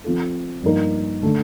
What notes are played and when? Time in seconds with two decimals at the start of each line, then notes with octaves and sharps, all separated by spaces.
0.04 F3 C4 F4 A4
0.63 G2 F3 A#3 D#4 A#4
1.23 D3 A3